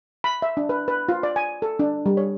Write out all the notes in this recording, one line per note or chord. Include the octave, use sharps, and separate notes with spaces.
B5
E5
D4
B4
B4
F4
D5
G#5
A4
D4
G3
C#5